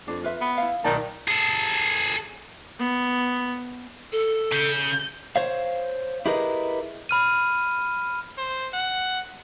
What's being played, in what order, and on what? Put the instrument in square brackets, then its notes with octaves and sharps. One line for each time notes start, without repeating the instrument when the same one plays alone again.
[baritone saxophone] F2 [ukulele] D4
[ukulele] F4 B4 E5
[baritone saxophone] B3
[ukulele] E4 F5
[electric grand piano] B1 D5 A5 [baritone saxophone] D#3 [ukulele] D#4 F4
[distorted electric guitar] G#4 A4
[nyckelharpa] B3
[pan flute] A4
[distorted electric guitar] C#3 [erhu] G6
[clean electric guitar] C5 C#5 F5
E4 G4 G#4 A#4 B4 D#5
[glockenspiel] B5 F6 D#7
[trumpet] C5
F#5